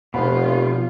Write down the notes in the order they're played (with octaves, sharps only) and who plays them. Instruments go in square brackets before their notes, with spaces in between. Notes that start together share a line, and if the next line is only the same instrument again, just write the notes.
[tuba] F1 [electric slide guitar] B2 F3 [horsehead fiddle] F4 [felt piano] C5 F#5 B5